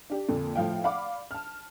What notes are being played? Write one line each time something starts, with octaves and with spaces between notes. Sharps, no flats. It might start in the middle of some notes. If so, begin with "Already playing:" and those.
D4 G4
F2 A#2 D3
A2 F3 F5 G5
D5 F5 F#5 B5 D6
A5 F6